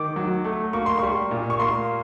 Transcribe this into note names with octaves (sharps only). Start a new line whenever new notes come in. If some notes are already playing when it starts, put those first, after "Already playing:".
Already playing: D#3 D6
F#3
A3
A#3 C#6
C6
G3 C#6
A#2
C#6
A#3 C6